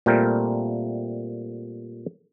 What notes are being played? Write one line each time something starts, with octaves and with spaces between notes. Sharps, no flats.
A#2 G3 A3 C4 A#4 G5